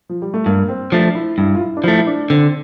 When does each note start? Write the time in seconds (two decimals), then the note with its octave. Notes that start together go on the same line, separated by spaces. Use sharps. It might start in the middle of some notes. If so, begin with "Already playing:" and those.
0.09 F3
0.22 G3
0.34 A3
0.46 G2 A#3
0.68 C4
0.92 F3 A3 D4
1.15 E4
1.38 G2 E4
1.55 F4
1.61 E4
1.77 D4
1.84 F3 A3 E4
1.99 E4
2.07 D4
2.30 D3 C4